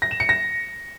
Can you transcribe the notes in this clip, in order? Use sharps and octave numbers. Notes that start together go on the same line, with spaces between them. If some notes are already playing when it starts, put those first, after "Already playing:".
A#6
E7
C#7
A#6